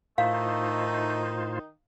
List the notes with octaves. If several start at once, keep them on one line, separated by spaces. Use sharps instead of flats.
A2 D#3 A3 D#4 F4 C5 F5